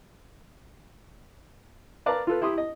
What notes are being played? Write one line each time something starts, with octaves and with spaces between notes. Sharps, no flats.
A#4 B4 D5 F5 A5 A#5
F4 A4 B4
E4 G4 C6 D#6
D#5